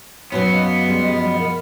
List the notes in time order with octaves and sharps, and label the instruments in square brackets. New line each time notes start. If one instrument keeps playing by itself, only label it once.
[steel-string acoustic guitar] F#2 B2 F#3 [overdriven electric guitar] B3 [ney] C#5
[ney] D#5 [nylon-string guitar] F5
[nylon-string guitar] G3 G#3
F3
[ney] A#4